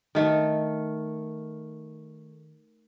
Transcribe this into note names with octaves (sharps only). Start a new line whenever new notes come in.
D#3 A3